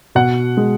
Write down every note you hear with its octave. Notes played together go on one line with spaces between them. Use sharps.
B2 F#5
G#3